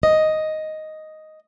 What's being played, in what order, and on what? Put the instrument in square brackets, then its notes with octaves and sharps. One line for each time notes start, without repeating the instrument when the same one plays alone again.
[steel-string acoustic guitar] D#5